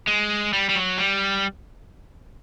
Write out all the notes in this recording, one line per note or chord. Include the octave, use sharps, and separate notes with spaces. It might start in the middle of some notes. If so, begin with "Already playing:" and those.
G#3
G3
G3
F#3
G3